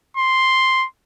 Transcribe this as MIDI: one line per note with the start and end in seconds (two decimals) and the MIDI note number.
0.17 0.86 84